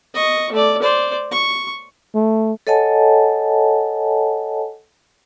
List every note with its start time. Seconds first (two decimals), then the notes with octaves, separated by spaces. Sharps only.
0.14 D#5 C#6
0.52 A3 D5
0.82 C5 D5
1.32 C#6
2.15 A3
2.67 A4 C#5 D#5 F#5 G#5 A5